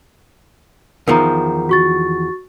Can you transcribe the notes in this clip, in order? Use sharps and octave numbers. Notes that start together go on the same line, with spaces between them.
E2 D#3 F3 A#4 A#5
F#4 C#6 A6